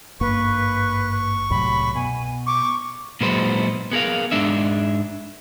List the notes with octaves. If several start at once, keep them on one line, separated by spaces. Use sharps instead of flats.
G#1 G2 A#3 B4 C#6
C2 F#2 A2 B5
B2 G#5
C#6 D6
A#2 F#3 G#3 B3 B4 C5
B3 G#4 A#4 F5
G#2 G#3 D4 E5